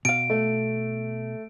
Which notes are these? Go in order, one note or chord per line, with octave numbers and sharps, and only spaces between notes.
B2 F5 D7
A3